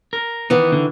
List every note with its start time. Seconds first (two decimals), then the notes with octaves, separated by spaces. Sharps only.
0.13 A#4
0.50 D#3 E3 B3
0.72 D3